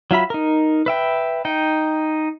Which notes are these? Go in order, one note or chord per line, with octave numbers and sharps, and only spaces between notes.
F#3 F4 E5 B5
D#4 A#4
B4 E5 G5
D#4 G5